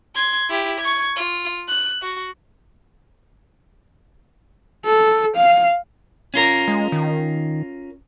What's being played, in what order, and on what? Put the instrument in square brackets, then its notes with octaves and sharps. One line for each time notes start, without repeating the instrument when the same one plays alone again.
[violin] C6 G#6
E4 G4
C#6 G#6
F4
F#6
F#4
[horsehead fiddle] A4
F5
[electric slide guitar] C#4 F4 A#4
[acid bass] G#3
D#3